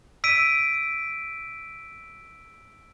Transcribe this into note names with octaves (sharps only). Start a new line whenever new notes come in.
E6 B6 D7 D#7